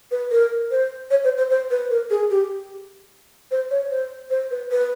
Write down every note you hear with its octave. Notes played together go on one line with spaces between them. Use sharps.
B4
A#4
C5
C#5
C5
C5
C5
B4
A#4
G#4
G4
C5
C#5
C5
C5
B4
B4